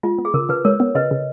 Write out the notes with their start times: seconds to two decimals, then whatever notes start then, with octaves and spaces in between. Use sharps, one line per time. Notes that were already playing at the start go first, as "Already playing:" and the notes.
0.03 G#3 F4
0.18 B3
0.25 G#4
0.34 C#3 A#4
0.49 C#3 B4
0.65 G#3 A#4 C#5
0.80 B3
0.95 C#3 B4 D#5
1.11 C#3